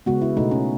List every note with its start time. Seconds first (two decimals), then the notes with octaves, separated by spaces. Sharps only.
0.06 C#3 G#3 B3 F#4
0.22 E4
0.37 B2 A3 D#4
0.51 C#4